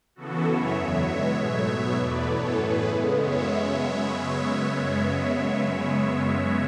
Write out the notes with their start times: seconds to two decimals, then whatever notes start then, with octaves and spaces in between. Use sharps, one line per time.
0.16 C#3 E3 B3 F#4 A4
0.46 F#2 C#3 E3 B3 C#5 E5
0.75 E2 D3 F#3 B3 C#5 E5
1.06 B2 G#3 B3
1.36 G#2 F#3 A3 C#5 E5
1.66 B2 F#3 B3 C#5 E5
1.96 E2 B2 A3 B4 D5
2.26 F#2 E3 B3 A4 C#5
2.57 A2 E3 A3 G#4 B4
2.87 C#3 G#3 B3
3.17 F#2 C#3 G#3 B3 C#5 E5